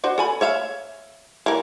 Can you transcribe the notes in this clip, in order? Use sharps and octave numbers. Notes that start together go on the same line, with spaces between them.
D4 F#4 C5
A4 G#5 B5
C#5 E5 F5
E3 A#4